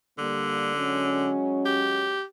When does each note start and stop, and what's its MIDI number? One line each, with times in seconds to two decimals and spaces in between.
0.18 1.31 50
0.18 0.75 55
0.18 0.75 58
0.77 2.20 54
0.77 2.20 56
0.77 2.20 61
1.65 2.23 67